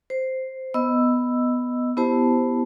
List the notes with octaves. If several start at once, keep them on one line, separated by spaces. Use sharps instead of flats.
C5
B3 D#5 E6
B3 E4 G4 C5 A5